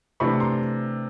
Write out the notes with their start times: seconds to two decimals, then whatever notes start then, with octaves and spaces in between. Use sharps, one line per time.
0.20 C3 E3 A3 D4 B5 C#6
0.40 A#5 C6